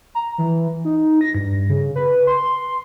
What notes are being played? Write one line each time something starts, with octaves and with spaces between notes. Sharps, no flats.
A#5
E3
D#4
A#6
G2
C#3
B4
C6